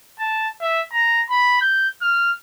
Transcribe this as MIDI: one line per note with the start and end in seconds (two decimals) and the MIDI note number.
0.19 0.48 81
0.62 0.81 76
0.92 1.21 82
1.30 1.59 83
1.61 1.88 91
2.02 2.32 89